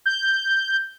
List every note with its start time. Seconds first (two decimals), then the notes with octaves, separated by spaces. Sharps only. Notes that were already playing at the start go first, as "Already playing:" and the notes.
0.06 G6